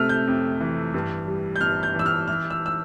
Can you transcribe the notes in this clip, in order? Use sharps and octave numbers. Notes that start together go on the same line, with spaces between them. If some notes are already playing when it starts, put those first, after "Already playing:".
Already playing: C3 A3 E6 F6
G6
F2
E3
G2
G3
G6
G1 F6
G6
E3 E6
F6
E3 F6
E6
E6